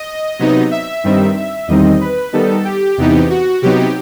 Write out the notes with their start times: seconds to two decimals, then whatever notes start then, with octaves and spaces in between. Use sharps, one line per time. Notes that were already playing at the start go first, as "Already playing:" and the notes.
Already playing: D#5
0.39 C3 F#3 B3 D#4
0.71 E5
1.04 G2 D#3 G3 C4 D#4
1.37 E5
1.68 E2 D#3 G3 C4 D#4 D#5
2.01 B4
2.33 D#3 G3 B3 D#4 A4
2.65 G4
2.98 E2 C3 E3 B3 D#4
3.30 F#4
3.62 C3 F#3 B3 D#4 G4